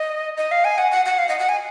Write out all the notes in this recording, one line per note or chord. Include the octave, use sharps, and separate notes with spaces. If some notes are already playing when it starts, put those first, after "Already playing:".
Already playing: D#5
D#5
F5
G#5
F#5
F#5
F#5
F5
D#5
F#5
G#5